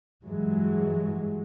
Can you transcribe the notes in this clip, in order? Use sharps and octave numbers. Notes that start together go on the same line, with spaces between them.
G2 E3 F#3 G#3